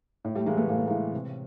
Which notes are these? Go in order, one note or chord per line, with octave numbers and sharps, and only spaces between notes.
A2
G3 A3
E3 G#3 A#3
A3 B3
A2 A#3
A3
E3 G#3 A#3
C3